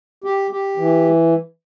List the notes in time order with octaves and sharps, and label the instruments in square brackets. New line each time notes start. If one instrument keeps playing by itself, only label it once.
[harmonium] G4
G4
E3